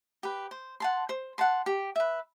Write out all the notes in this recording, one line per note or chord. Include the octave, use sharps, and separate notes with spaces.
G4 B4
C5
F#5 A5 C6
C5
F#5 A5 C6
G4
B4 E5